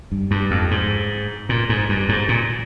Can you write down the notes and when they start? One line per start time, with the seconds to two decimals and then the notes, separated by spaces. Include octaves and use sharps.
0.12 G2
0.31 G2
0.51 F2
0.71 G#2
1.49 A#2
1.69 G#2
1.89 G2
2.09 G#2
2.29 A#2